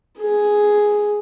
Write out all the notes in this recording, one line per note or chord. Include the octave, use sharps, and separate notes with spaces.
G#4